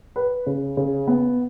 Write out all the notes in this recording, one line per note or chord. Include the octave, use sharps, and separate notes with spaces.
B4
C#3
C#3
B3